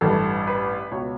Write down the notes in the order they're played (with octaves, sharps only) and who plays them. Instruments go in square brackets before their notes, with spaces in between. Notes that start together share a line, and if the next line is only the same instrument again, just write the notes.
[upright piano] A1 G2 E3 A4
B4
C#2 B2 C#5